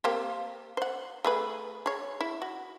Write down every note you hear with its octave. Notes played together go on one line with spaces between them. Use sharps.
A#3 C4 G4
C5 F#5
A3 G#4 B4
G#4 C#5
E4
F#4